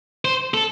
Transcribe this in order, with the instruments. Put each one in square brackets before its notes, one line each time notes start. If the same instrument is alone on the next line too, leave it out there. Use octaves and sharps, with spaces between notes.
[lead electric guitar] C5
A4